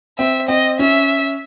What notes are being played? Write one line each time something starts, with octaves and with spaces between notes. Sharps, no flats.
C4 E5
C4 D#5
C#4 E5